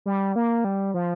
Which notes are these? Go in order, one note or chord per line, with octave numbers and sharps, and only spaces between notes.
G3
A#3
G3
F3